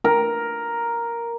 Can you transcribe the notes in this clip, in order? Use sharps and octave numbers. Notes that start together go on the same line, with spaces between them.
A#4